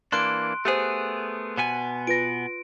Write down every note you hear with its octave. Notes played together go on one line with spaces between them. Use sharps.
E3 A#3 D4 C6 F#6 D7
A3 B3 G4 G#4 C5
B2 B3 G#5
F4 B4 A#6 D7